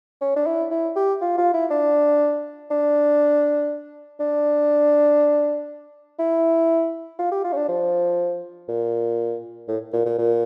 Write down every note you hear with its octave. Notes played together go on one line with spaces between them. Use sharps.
C#4
D4
E4
E4
G4
F4
F4
E4
D4
D4
D4
E4
F4
G4
F4
C#4
D4
F3
A#2
A2
A#2
A#2
A#2